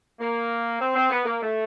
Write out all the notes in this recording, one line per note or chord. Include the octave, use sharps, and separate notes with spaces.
A#3
C4
C4
B3
A#3
A3